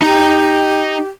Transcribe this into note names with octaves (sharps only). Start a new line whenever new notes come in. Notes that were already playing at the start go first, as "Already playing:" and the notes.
D#4 G4 A#5